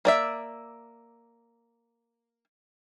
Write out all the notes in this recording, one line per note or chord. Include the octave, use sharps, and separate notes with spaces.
A#3 D5 E5